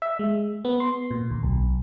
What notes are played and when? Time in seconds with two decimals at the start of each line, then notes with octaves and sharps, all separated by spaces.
0.02 E5
0.19 G#3
0.65 B3
0.80 C6
1.11 A#2
1.31 D2
1.43 B1